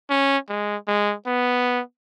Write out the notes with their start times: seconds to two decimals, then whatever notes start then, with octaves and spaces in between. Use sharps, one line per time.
0.10 C#4
0.49 G#3
0.87 G#3
1.26 B3